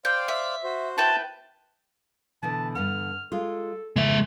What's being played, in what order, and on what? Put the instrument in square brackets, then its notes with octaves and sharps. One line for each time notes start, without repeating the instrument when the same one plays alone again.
[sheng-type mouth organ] C5 D5 F5 [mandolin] G5
[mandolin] E5
[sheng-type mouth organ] F#4 C5
[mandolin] E4 B4 G5 [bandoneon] A5
[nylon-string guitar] B2 D3 E3 [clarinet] A5
[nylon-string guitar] G2 D3 F#5 [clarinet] F6
[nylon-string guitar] G#3 F4 [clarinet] A4
[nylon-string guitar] F2 G#2 E3 [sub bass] C#3 [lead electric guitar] G#3 E5